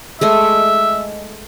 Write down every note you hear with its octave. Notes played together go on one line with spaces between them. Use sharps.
G#3 A3 D#5 E5